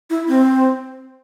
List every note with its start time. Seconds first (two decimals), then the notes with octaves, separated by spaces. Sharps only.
0.10 E4
0.28 C4